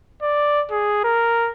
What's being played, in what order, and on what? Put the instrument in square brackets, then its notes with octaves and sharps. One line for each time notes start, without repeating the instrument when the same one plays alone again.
[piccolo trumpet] D5
G#4
A#4